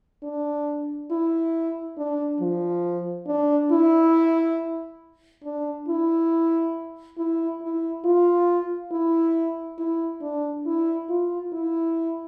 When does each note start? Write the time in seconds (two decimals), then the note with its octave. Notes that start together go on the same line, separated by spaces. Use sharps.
0.23 D4
1.11 E4
1.97 D4
2.40 F3
3.27 D4
3.71 E4
5.44 D4
5.88 E4
7.18 E4
7.62 E4
8.05 F4
8.92 E4
9.79 E4
10.22 D4
10.66 E4
11.09 F4
11.53 E4